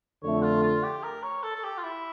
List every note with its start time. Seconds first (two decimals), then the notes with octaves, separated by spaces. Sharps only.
0.23 F2 D3 A3 C#5
0.43 F4
0.63 F4
0.83 G4
1.04 A#4
1.23 C#5
1.43 A4
1.55 A4
1.64 G4
1.78 F4
1.83 E4